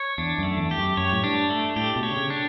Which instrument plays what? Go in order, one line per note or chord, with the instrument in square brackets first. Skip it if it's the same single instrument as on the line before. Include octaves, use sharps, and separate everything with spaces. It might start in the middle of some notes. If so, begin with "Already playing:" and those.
Already playing: [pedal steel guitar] C#5
[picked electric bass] E2 [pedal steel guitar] D4
[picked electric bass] F#2
[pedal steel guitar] A3
[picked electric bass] E2
[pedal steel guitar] G4
[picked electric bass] F#2
[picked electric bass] F#2 [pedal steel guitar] C#5
[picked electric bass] A2
[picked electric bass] G2 [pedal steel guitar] D4
[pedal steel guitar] A3
[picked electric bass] A2 [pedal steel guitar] G4
[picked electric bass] B2
[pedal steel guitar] C#5
[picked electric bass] D3
C#3
[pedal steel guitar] D4